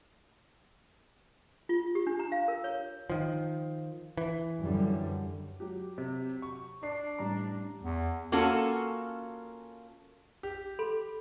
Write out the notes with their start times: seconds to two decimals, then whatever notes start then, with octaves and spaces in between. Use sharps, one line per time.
1.69 F4
1.95 G4
2.07 D4
2.19 A#5
2.32 F5
2.48 A#4
2.64 C#5
3.10 D#3 F3
4.18 E3
4.61 F#2 D3 G3
5.60 F#3 G4
5.98 C3
6.42 C#6
6.83 D4 D5 C7
7.18 A1 G3 A#5
7.83 E2
8.32 A#3 C#4 F4 F#4 A4
10.43 G4
10.79 A4 B5 C6